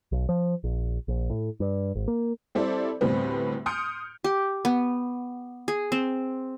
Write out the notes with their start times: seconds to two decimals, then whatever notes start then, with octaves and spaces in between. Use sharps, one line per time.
0.12 B1
0.29 F3
0.64 A#1
1.08 A#1
1.30 A2
1.60 G2
1.95 G#1
2.08 A#3
2.55 G3 C4 E4 A4 C5 D5
3.01 D2 A2 G3 B3 C4
3.66 C6 D#6 F6 G6 C#7 D7
4.24 G4
4.65 B3
5.68 G#4
5.92 C4